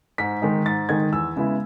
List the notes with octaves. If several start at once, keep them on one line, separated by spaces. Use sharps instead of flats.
G#2 B6
D#3 G#3 D#4
G#2 A6
D#3 G#3 D#4 G#6
E2 E6
C#3 G#3 B3 E4